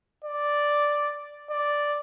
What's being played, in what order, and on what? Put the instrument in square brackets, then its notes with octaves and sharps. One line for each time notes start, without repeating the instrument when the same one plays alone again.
[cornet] D5
D5